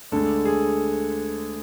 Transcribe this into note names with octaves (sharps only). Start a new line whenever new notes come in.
D2 D3 G#3 A4
G#4